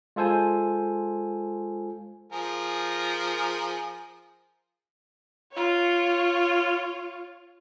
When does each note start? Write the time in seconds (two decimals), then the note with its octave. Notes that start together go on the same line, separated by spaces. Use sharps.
0.16 G#3 F4 A4 C5 G#5
2.32 F3 G#4 A#4
5.52 F4 C#5